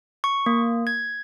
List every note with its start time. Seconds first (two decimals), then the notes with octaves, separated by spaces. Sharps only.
0.24 C#6
0.46 A#3
0.87 G#6